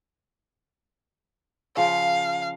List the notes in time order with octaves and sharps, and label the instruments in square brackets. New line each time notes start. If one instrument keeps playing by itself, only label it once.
[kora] C#3 F3 [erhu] F5